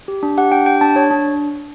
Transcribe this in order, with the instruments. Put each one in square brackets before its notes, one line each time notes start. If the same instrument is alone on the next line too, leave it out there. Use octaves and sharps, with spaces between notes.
[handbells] G4
D4
G4 F#5
D4 G5
G4 G5
D4 A5
D4 C#5
D4